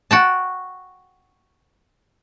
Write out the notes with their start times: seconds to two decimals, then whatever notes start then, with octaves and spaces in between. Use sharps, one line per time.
0.11 F#4 G5 A5